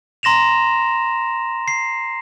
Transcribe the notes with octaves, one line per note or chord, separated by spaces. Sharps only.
A#5 C6 A#6 E7 F7
C7